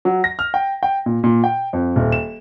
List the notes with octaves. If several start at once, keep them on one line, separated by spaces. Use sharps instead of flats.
F#3
A#6
F6
G5
G5
A#2
A#2
G5
F2
D#1
E7